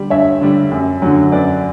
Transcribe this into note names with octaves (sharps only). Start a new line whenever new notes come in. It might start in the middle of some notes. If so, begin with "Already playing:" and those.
Already playing: D3 G3
G2 C#5 E5
D3 G3
F#2
D3 F#3
F#2 B4 D5